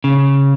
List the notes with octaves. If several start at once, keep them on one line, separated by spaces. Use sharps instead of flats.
C#3